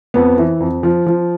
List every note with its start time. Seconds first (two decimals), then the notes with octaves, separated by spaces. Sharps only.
0.14 F2 B3
0.38 E3
0.60 F2
0.83 F3
1.06 F3